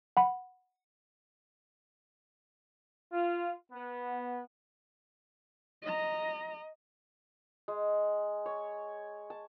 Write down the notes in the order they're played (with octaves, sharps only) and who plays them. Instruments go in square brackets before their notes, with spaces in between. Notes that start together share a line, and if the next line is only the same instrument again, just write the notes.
[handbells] F#5 B5
[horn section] F4
B3
[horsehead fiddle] D#5 A#5
[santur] G#3
C#5
A5